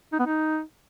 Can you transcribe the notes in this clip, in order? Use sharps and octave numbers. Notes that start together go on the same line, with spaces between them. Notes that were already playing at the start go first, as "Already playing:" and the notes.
D#4
B3
D#4